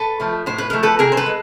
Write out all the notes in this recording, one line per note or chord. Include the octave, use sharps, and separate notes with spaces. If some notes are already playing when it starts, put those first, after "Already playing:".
Already playing: A4 B4
F3 A3
A2 C5
B4
F3 A3 A#4
A4 B4
C3 G#4 A#4
C5
A4 B4
G#3